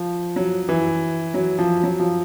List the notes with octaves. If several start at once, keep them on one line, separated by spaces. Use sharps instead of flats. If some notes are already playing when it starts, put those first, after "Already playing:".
Already playing: F3
F#3
E3
F#3
F3
F#3
F3